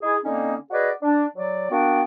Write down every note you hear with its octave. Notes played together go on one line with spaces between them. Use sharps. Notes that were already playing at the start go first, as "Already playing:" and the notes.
D#4 E4 G#4
D3 A#3 C4 C#4 D#4
F#4 G#4 B4 D5 D#5
D4
F#3 D5
A#3 B3 D4 F#4 G5